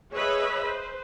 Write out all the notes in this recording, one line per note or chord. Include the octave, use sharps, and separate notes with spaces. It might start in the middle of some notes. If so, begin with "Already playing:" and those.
G#4 B4 C#5 D#5 E5 B5
B4 C5